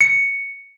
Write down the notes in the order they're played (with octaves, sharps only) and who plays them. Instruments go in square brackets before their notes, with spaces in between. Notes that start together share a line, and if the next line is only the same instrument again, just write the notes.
[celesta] C#7